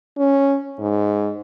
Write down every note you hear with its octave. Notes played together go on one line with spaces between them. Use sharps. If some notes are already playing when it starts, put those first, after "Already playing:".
C#4
G#2